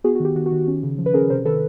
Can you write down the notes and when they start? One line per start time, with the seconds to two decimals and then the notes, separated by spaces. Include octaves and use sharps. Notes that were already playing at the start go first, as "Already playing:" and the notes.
0.04 B3 F#4 G#4
0.15 F#4
0.20 D#3 G4
0.35 D#3 F#4
0.46 F#4
0.52 D#3
0.67 C#4
0.83 C#3
0.98 F3
1.06 B4
1.14 C#4 G#4 A#4
1.30 C3 A#4 C5
1.46 D#3 A4 B4